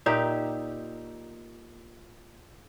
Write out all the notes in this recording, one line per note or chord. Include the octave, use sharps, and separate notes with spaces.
A#2 D#4 G4 E5